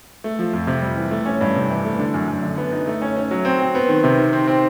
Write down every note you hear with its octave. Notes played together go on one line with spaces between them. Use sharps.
A3
F3
F2
C3
G3
E3
A3
C#4
G2
C3
E3
A3
D3
F#2
F#2
D3
B3
D#4
A3
C#4
C#4
F#3
C4
C4
B3
D#3
C3
D#3
C4
C4